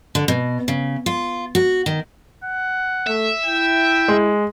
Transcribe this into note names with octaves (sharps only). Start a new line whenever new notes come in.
D3
B2
C#3
F4
F#4
D#3
F#5
A3 E5
E4 G5
G#3